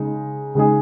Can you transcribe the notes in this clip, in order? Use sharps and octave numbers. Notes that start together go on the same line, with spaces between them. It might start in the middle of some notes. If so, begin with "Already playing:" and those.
Already playing: C#3 G#3 D#4
C#3 G#3 D#4 G#4